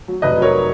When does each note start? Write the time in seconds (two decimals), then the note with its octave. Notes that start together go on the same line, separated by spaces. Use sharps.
0.08 F#3
0.22 F1 B4 D#5
0.37 F#3 A#4 C#5